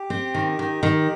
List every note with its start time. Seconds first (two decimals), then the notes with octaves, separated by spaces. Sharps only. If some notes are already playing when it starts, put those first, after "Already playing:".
Already playing: G4
0.10 C4
0.35 D#3
0.59 D#3
0.83 D#3